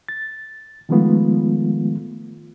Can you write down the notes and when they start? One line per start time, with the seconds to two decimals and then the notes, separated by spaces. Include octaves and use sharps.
0.09 A6
0.89 D#3 F3 G#3 A3 B3 F4